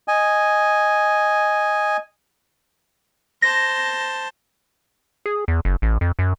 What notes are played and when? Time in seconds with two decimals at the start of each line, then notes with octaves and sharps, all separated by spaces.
0.08 D#5 G#5
3.42 C5 A5 A#6
5.26 G#4
5.48 E2
5.65 F#1
5.82 A1
6.01 F2
6.19 F#2